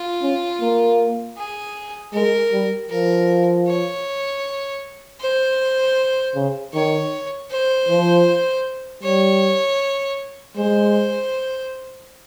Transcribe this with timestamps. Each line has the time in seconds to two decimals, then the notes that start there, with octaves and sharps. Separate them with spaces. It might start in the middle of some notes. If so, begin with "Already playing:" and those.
Already playing: F4
0.22 C#4
0.61 A#3
1.37 G#4
2.14 G#3 A#4
2.52 G3
2.90 F3 A#4
3.67 C#5
5.21 C5
6.35 C#3
6.73 D#3 C#5
7.51 C5
7.89 F3
9.03 G3 C#5
10.57 G#3 C5